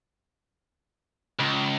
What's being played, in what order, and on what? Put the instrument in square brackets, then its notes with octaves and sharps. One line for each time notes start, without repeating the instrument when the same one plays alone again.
[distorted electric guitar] C#2